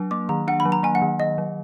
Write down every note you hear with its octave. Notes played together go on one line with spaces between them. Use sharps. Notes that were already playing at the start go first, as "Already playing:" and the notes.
Already playing: F#3 D4
A#3 D6
D#3 A#5
D4 F#5
B5
F#3
A#5
A#3 G#5
F#5
D#3
D#3 D#5
F#3